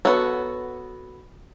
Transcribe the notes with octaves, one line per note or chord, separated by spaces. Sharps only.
B3 F#4 A4 C#5